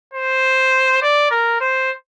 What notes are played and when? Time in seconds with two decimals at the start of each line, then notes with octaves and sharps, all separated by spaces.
0.14 C5
1.02 D5
1.31 A#4
1.61 C5